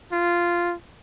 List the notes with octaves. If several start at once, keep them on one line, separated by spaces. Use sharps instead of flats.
F4